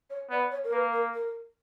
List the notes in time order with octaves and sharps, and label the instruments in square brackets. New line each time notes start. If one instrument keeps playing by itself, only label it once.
[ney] C#5
[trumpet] B3 [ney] D5
[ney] C#5
A#4
[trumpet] A#3 [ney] B4
[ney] A#4
A#4